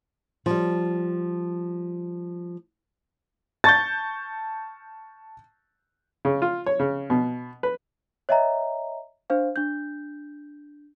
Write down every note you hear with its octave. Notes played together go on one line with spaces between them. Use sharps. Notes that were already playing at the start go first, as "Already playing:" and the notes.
F3 G3
A5 C#6 G6 A6
C#3
F4
C#5
C#3
B2
B4
C#5 D#5 E5 G5 A#5
D4 C5 F5
D4 G6